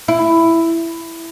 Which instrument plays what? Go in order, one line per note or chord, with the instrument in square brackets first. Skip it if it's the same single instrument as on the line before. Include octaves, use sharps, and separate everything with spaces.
[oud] E4